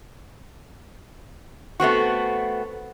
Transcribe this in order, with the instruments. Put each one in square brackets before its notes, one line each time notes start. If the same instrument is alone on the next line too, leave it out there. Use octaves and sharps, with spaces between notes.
[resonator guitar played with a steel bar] A3 B3 C4 F#4